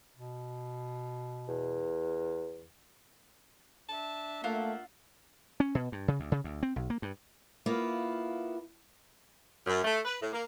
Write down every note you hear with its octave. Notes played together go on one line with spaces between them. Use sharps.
B2
E2
D4 E5 A5
A3 A#3 F4 F5 F#5
C#4
B2
G2
C#3
D2
C#3
D2
C4
B1
A#3
G2
A#3 B3 E4 F4
F#2
A3
B4
A2
A#3